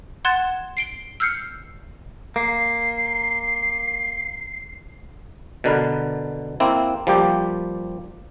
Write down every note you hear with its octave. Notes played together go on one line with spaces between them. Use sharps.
F#5 C6 F#6 G#6 A6 E7
C7 D7 G7
E6 F6 G6 C7 C#7
A#3 C7
B2 D3 A#4 B4
A#3 C4 E4
F3 G3 A#3 G4